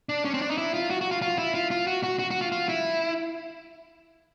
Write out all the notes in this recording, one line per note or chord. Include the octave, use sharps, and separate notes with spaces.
D4
C#4
C4
D4
D#4
E4
F4
F#4
F#4
F4
F4
E4
F4
F4
F#4
F#4
F#4
F#4
F4
F4
E4